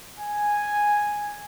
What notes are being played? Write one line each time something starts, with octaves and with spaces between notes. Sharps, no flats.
G#5